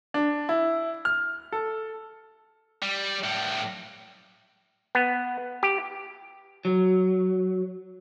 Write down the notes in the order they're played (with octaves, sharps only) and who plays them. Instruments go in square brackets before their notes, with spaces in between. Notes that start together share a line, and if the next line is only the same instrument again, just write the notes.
[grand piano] D4
E4
F6
A4
[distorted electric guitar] G3
A2 G3
[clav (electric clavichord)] B3
G4
[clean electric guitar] F#3